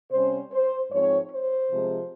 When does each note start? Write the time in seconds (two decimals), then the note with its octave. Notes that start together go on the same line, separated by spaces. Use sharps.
0.12 C3 G3 C#4 C5
0.52 C5
0.91 G#2 F3 C4 C#5
1.32 C5
1.72 C3 F3 G#3